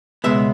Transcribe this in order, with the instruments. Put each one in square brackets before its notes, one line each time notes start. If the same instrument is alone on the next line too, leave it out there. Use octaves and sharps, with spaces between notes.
[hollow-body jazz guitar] C#2 B2 G#3 B3 E5